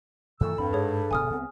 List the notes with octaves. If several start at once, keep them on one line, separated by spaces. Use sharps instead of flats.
F#2 A#2 D#3 E3 A3 A4 E6
E2 G2 C4 B5
G#2 G#4 C#5
D1 B2 G#5 D#6 F6
C2 B3 C4